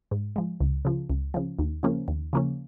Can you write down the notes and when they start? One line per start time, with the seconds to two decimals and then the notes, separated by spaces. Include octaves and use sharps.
0.11 G#2
0.36 F3 G#3
0.60 C#2
0.85 C#3 F3
1.10 C#2
1.34 C#3 F3
1.59 D#2
1.83 C#3 F3 A#3 C#4
2.08 D#2
2.33 C#3 F3 A#3 C#4